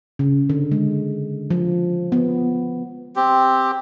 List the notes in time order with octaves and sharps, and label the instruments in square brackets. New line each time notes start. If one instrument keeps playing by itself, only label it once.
[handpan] C#3
D3
G#3
F3
B3
[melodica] C4 G4